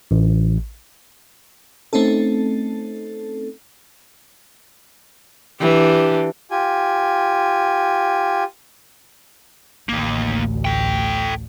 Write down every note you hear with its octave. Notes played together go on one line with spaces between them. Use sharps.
A1
A3 C4 C#4 D#4 A4
E3 D4 G4
F4 G4 G#5
A1 D2 D#3 A#3
A4 G5